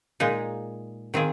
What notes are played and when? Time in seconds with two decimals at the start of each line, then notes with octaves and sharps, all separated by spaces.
0.20 A#2 G#3 D#4
1.14 D#3 C4 F4 G#4